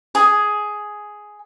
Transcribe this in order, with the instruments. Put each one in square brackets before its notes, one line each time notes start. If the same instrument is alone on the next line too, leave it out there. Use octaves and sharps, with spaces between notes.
[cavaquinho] G#4